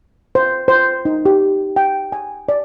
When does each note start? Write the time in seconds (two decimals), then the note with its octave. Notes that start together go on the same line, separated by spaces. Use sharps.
0.35 C5
0.68 C5
1.05 D#4
1.26 G4
1.76 G5
2.12 G#5
2.49 D5